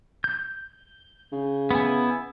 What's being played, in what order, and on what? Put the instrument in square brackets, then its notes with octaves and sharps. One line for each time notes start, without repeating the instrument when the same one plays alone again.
[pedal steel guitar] G6
[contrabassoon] C#3
[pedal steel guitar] B3 E4 G#5